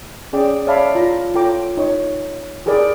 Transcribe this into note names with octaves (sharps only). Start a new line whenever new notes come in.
C#4 G#4 D5 G5 D6
C#5 D5 E5 F5 A5 B5
F4 A#5
F4 A4 C#5 G5 A#5 D6
D#4 C#5 C#6
G4 G#4 A#4 B4 D5